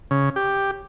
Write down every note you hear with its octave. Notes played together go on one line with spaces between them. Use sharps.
C#3
G4